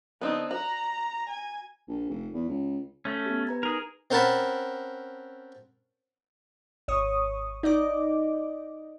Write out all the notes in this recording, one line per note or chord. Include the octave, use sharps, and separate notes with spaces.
D3 B3 C4 D#4
F#4 A#5
G#5
A#1
F1
E2
C#2
A3 C#4
B3 G4
B4 A#5 G#6
D#4 G#4 A#4
C4 C#4 A#4 F#5 A5 B5
G#1 C#5 C#6 D#6
D#4 D5 D#5 D6